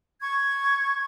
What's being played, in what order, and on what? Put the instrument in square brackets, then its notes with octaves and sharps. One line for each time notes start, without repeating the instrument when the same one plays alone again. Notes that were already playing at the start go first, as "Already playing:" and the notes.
[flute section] C#6 G#6